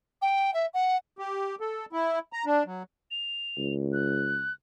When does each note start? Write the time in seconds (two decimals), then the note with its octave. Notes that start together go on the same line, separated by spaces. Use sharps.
0.21 G5
0.53 E5
0.73 F#5
1.18 G4
1.60 A4
1.93 E4
2.33 A#5
2.46 D4
2.66 F#3
3.11 F7
3.58 C#2
3.93 F#6